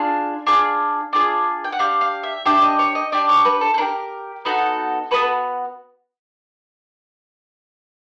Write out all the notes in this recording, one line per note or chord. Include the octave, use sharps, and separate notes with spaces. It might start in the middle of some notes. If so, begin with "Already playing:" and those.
Already playing: D4 F4 G#4 F5
D4 F4 G#4
D4 F4 G#4
G5
F#5
D4 G4 F5
F5
E5
D4 G4 E5
D#5
C#5
D#5
D4 G4 D5
C#5
B4
A4
A4
D4 G4 A#4
B3 D#4 F#4 A4
B3 D#4 F#4 A4 B4